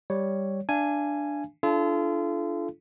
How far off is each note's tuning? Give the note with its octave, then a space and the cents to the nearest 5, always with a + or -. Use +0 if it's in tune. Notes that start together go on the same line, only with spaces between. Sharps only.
G3 +0 C#5 +0
D4 +0 F5 -40 G#5 +0
D4 +0 F4 -35 A4 -30